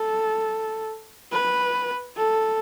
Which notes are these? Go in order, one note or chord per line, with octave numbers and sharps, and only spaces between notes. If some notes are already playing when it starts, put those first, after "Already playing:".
Already playing: A4
B4
A4